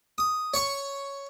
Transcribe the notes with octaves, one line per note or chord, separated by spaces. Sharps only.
D#6
C#5 C#6